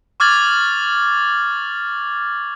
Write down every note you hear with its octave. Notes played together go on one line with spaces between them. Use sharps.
C#6 D6 F6 G#6 A6 F#7